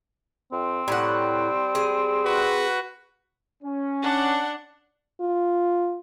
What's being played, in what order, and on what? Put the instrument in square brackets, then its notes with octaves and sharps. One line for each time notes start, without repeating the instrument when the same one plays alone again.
[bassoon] F2 [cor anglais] C4
[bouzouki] A2 F#5 [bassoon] G3
[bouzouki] G#4
[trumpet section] F#4 B4
[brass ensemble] C#4
[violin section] D4 F#5
[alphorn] F4